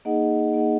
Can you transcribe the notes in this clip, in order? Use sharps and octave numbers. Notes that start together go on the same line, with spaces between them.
A#3 D#4 G#4 D#5 F#5
A#3 D#4 G#4 D#5 F#5